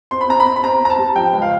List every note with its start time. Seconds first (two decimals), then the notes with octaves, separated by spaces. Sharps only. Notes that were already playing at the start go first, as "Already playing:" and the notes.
0.11 C4 C6
0.21 B5
0.29 C4 A#5
0.40 B5
0.46 C4
0.56 B5
0.64 C4 A#5
0.81 C4 A#5
0.90 A5
0.98 G3
1.16 F3 G5
1.33 C#2
1.42 F5